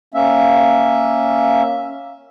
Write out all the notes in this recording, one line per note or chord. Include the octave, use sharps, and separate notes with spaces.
A#3 C#4 E5